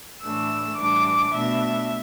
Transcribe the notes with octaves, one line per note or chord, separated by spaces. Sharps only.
A2 E3 A3 D4 E6
A2 E3 G3 D4 D6
B2 A3 D4 E5